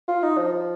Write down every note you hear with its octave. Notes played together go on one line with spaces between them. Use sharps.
F4
D#4
F3
F3